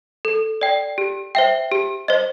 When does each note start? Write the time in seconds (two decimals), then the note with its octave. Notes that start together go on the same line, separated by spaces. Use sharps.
0.25 A4
0.61 D5 G5
0.98 G4
1.35 C5 E5 G5
1.72 G4
2.08 C5 D#5